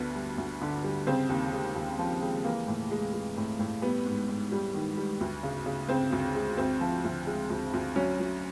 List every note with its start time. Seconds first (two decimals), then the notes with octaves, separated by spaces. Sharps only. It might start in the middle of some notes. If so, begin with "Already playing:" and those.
Already playing: D2 D3 B3
0.15 G3
0.38 D2
0.61 D3
0.84 G3
1.07 C#3 C4
1.29 D#2
1.52 G#3
1.75 D#2
1.99 F3
2.22 G#3
2.44 E3 A#3
2.67 A2
2.91 G#3
3.13 G#3
3.37 A2
3.59 A2
3.82 G3 B3
4.05 G#2
4.28 G#2
4.52 G3
4.74 D#3
4.97 G3
5.21 D2
5.43 C#3
5.66 C#3
5.89 C#3 C4
6.12 D2
6.35 G#3
6.57 D2 C4
6.81 F3
7.05 D2
7.27 G#3
7.50 D2
7.73 D2
7.96 F#3 C#4
8.19 F#3